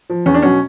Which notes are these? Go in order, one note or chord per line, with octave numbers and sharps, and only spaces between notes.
F3
E2 C#4
D4
B2 F#3 C#4